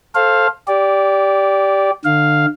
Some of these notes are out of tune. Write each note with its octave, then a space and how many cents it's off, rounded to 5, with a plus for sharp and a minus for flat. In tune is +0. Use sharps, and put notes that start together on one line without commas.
A4 +0 C5 +25 F5 +0
G4 +0 D5 -15
D3 +30 F5 +0